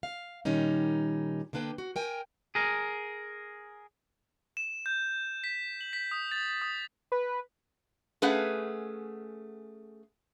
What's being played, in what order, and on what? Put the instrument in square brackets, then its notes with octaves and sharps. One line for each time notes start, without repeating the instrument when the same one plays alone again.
[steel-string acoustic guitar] F5
A#2 D#3 G3 C#4 D#4
D3 A#3 D4 B4 G5
F#4
A#4 G5 G#5
[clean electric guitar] G#4 A#4
[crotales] E7
G6
B6
F#7
B6
D#6
A6
D#6
[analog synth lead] B4
[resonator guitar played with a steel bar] A3 C#4 G#4 B4 F5 F#5